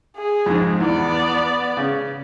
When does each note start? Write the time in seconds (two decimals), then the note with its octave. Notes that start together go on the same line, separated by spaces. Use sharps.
0.16 G#4
0.46 F2 G#2
0.80 E2 B3 D5
1.77 C#3